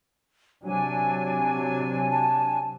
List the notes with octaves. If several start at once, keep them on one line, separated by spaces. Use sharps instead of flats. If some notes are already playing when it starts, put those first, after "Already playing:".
C3 F#3 D4 G#5
A5